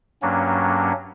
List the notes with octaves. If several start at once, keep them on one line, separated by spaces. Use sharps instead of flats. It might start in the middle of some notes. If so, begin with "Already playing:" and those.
G2 F#3 A#3 C#4 D4